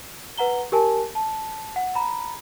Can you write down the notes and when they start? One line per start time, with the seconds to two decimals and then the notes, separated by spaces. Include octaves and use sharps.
0.38 B4 F#5 A#5 G7
0.72 G4 A#4 G#5 A5
1.15 A5
1.76 F#5
1.95 A#5 B5